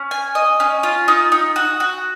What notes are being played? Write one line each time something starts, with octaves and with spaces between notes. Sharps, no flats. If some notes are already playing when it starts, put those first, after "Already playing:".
Already playing: C#4
G#5
D#5
C#4
F4
D#4
D#4
F#4
F#4